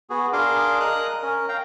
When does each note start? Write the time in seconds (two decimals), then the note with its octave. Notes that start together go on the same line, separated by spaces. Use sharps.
0.10 B3 F#4 G#4
0.33 D4 G#4 A#4 F5 C6 D6
0.80 A#4 D#5 A#5 D#6 F#6
1.23 C#4 A#4
1.49 F5 G5 A#5